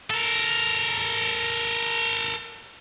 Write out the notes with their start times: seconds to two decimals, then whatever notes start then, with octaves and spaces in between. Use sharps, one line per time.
0.10 A4 A#4